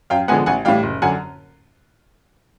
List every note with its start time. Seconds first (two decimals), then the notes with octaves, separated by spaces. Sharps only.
0.10 F#2 F5 G5
0.28 D3 F3 G#3 B3 F#5 G#5
0.46 A1 F#5 G#5
0.65 A2 E3 G3 F5 G5
0.83 F#1
1.02 F#2 D3 F#5 G#5